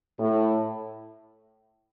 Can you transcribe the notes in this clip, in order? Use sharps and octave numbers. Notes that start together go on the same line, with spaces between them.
A2